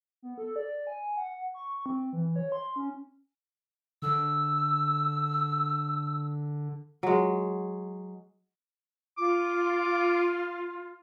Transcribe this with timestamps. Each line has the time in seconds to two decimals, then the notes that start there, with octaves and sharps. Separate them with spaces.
0.22 B3
0.38 A4
0.56 D5
0.87 G#5
1.17 F#5
1.54 C#6
1.86 C4
2.13 E3
2.36 C#5
2.52 C6
2.76 C#4
4.02 D3 E6
7.03 F#3 G#3
9.18 F4 D6